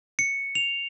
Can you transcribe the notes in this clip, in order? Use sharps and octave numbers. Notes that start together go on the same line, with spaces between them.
C#7
F7